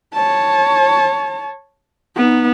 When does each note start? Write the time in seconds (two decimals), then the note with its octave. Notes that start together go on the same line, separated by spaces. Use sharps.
0.15 C#5 A5
2.16 B3 D#4